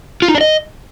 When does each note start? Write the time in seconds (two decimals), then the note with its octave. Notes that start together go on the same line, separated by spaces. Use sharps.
0.22 F4
0.28 D#4
0.35 D4
0.41 D#5